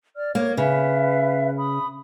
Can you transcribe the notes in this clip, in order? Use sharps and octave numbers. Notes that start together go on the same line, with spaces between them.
D5 F6
A#3 C#5 D6
C#3 B4 E5 F5
B5 D#6